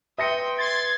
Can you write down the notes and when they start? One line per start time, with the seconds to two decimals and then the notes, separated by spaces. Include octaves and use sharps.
0.18 B4 E5 G5 C6 D#6 A#6 C#7
0.58 C6 G#6 A6